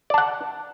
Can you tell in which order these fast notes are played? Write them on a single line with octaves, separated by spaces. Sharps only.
D5 A5 F#5